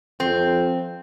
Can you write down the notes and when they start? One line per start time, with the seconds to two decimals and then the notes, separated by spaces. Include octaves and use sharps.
0.20 F2 C4